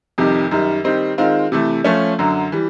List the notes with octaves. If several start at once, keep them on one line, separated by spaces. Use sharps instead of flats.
F2 C3 D#3 G3
F#2 D#3 G3
D#3 G3 C4 D#4
D#3 G#3 C4 F4
C3 E3 A3
F3 A3 C#4
F#2 D3 F#3
E3 G3